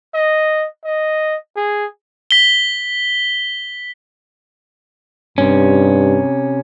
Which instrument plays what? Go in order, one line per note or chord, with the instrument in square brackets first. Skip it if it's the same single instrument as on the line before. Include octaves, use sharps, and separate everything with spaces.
[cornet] D#5
D#5
G#4
[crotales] B6 G7
[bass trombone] G2 [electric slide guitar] C3 C#4